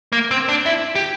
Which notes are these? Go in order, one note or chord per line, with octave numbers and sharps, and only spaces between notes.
A#3
C4
D4
E4
G4